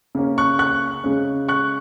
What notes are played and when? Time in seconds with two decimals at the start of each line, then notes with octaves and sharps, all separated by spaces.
0.15 C#3 A#3 C#4
0.38 C#6 F#6
0.59 C#6 F#6
1.04 C#3 G#3 C#4
1.49 C#6 F#6